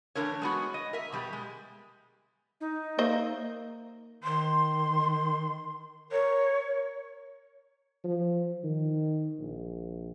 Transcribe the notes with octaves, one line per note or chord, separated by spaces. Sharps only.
E3 G#3 A3 D4 A#4 C#5
G#3 B3 F#4
D#5
A#4 E5
B2 G3 G4
G#3
D#4
A#3 C5 D#5 E5
D#3 C6
A#4 C#5
F3
D#3
A#1